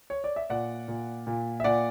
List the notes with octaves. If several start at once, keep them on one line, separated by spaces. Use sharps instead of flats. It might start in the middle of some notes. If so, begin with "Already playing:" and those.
C#5
D5
E5
A#2 D5 F#5
A#2
A#2
E5
A#2 D5 F#5